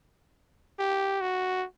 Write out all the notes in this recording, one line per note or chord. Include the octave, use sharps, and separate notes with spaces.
G4
F#4